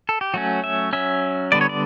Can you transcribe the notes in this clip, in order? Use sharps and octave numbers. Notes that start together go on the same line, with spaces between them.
A4
G4
F#3 A3 C#4 F#4
E5
F#3 C#4 E5
D3 G3 B3 D5
C#5
D5